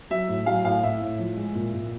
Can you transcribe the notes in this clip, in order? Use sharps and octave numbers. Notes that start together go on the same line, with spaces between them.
F#3 E5
A2
F#3 F5
A2 F5
A2 E5
A2
F3
G#3
A#2
A#2